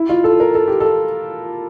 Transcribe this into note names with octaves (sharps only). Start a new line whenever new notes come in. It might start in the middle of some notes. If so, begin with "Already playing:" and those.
Already playing: E4
F4
A4
A#4
A4
G4
A4